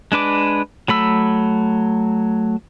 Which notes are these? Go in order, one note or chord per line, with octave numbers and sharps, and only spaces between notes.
G#3 D4 B4 D6
F#3 A3 B5 E6